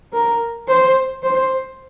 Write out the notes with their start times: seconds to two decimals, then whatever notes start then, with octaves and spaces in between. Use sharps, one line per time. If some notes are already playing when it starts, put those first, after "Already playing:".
0.13 A#4
0.68 C5
1.23 C5